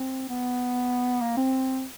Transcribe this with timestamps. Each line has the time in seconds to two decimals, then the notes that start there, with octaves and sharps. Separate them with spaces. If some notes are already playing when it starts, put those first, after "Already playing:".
Already playing: C4
0.29 B3
1.21 A#3
1.37 C4